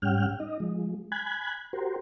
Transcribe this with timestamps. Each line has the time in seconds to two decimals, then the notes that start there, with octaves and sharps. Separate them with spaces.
0.02 G#2 G3 C#4 F#5 G5 F6
0.40 D#4 D#5
0.60 F3 G#3
1.12 G#5 B5 F#6 G#6
1.73 F#4 G4 A#4 C5